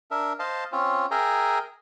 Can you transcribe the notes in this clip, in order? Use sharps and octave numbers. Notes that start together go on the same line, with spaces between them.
D4 A#4 E5
C5 D#5 F5 A5
C4 C#4 F4
G#4 A#4 E5 G5 G#5 A#5